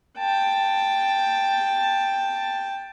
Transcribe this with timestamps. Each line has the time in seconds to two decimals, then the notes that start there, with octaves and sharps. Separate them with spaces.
0.18 G5 A5